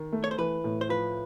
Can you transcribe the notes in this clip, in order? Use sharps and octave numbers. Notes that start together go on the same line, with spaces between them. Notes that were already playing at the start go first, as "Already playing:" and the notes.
Already playing: D#3
A3
C#5
C5
E3 B4
A2
C5
F3 B4